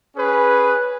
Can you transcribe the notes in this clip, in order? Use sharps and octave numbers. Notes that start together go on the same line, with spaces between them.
C#4 G#4 B4